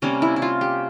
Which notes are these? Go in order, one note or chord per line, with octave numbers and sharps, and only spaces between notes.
C3 G3 A#3 C#4
E4
E4
F4
G4